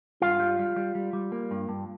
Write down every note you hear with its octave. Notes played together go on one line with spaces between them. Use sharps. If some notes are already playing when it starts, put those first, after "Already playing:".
G2 F4 F5
G3
G3
G3
G3
G3
A#3
G2
G2